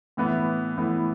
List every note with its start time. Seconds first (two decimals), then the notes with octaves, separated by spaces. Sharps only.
0.17 A2 E3 B3
0.77 A2 E3 B3